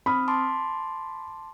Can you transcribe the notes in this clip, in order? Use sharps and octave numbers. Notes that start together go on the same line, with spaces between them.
C4 B5 D#6 F6
A5 C6 D6